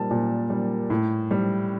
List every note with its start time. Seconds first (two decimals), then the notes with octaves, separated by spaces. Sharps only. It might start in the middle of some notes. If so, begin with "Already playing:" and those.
Already playing: A#2 G3 A5
0.11 A#2
0.50 G3
0.90 A2
1.31 G3